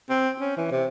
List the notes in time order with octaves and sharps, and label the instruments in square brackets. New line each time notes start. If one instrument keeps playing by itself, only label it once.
[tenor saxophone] C4
C#4
E3
C3